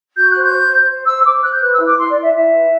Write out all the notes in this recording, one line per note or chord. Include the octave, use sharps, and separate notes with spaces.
F#4 G6
F#6
C5
G6
C5
C5
C5
C5 E6
C5 D6
C5 F#6
G6
B4 F#6
E6
E4
D6
E4 C6
D5
E4
E5
E4 E5
B4